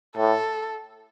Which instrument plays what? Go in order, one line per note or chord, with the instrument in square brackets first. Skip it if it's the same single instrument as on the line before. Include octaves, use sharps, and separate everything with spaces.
[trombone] A2 [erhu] A4